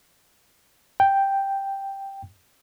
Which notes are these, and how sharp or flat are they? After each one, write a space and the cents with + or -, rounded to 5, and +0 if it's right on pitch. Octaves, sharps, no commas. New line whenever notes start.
G5 +0